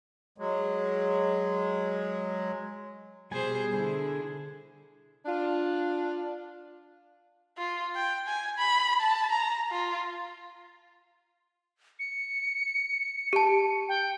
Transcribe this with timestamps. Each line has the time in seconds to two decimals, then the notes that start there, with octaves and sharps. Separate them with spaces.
0.38 F#3 G#3
3.31 B2 G3 G#4 C5 G#5
3.73 D3 D4 E4 G#4
5.25 D4 F4
7.58 F4
7.96 G5
8.27 G#5
8.58 B5
9.00 A5
9.31 A#5
9.71 F4
11.99 C#7
13.33 G4 A5
13.89 G5